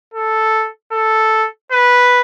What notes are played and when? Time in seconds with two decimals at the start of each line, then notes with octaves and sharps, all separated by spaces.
0.14 A4
0.92 A4
1.72 B4